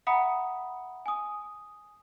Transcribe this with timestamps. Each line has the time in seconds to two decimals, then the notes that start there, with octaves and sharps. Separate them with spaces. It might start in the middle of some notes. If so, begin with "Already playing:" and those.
0.07 E5 F#5 A#5 B5 D#6 C#7
1.06 G#5 D#6